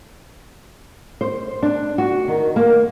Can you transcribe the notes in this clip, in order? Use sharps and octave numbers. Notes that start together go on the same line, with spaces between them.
C5
D4
F#4
D#3
A#3